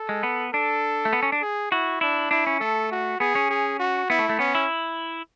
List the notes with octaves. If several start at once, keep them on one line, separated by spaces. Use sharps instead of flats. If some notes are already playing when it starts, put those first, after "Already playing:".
Already playing: A4
G#3
B3
D4 A4
A3
B3
C#4
D4
G#4
E4 F#4
D4 E4
D4 E4
C#4
A3 A4
F#4
B3 G#4
C#4
G#4
F#4
B3 E4
A3
A3
B3 C#4
E4